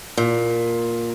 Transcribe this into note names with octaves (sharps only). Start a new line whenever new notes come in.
A#2